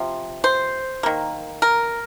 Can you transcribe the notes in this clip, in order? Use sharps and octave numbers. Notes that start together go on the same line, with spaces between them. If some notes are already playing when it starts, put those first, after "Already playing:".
Already playing: C3 F3
C5
D#3 A#3
A#4